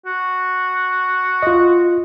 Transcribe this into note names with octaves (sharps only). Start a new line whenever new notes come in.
F#4
F4 D#5